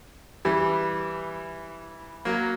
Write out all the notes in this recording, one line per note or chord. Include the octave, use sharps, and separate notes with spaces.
E3 G3
F#3 A#3